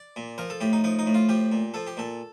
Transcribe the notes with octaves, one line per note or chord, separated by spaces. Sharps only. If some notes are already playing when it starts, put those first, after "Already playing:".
Already playing: D5
A#2
F3 A#4
A4
A2 G4
D#4
F3 D#4
D#4
A2
F4
F3 G4
A#2
F3 A4
G4
A#2 A4